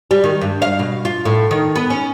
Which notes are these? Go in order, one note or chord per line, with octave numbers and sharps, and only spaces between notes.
G3
D#3
G2
F5
B2
F4
A2
D#3
B3
C#4